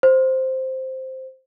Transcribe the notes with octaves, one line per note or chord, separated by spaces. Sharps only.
C5